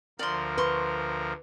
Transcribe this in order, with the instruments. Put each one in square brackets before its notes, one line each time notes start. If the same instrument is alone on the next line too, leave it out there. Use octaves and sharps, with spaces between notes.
[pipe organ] D2 F3 A#4 [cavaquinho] D5 C6
[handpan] B4 [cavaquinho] C6 C#6